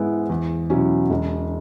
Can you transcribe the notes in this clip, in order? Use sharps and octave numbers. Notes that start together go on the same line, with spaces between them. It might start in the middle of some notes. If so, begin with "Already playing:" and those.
Already playing: G#2 G#3 B3 E4
E2
B2 F#3 C#4 E4
E1